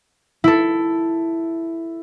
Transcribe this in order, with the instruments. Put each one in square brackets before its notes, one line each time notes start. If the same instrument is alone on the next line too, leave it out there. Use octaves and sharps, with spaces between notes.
[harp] E4 A4